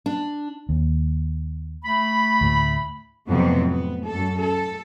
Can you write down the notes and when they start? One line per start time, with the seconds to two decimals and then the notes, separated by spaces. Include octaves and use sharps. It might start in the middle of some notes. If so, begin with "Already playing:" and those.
0.06 D4
0.69 D#2
1.84 A3 B5
2.41 D2 A2
3.29 F2 A2 C3 F#3 B3 C4
3.69 B3
4.06 F#2 A4
4.41 A4